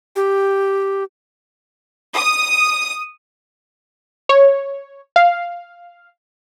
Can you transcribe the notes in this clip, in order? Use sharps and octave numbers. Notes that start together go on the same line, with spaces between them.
G4
D#6
C#5
F5